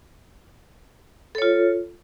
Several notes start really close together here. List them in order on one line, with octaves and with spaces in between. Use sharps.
A4 C#5 F4